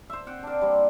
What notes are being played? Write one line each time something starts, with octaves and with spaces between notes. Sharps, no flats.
C5 E5
C4 F#5 G5
D4 A#4
G3 A#3 C4